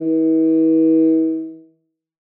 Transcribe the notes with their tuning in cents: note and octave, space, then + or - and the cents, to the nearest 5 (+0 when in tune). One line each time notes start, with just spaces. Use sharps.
E3 -45